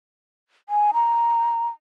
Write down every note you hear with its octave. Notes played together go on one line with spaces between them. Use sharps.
G#5
A#5